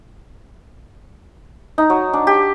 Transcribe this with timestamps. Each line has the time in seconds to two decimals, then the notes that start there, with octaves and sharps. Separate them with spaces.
1.78 D#4
1.90 F#3
2.13 D4
2.27 G4